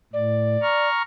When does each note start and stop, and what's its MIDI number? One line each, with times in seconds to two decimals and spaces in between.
0.13 0.57 45
0.13 0.88 74
0.62 1.02 82
0.62 1.02 85
0.62 1.02 89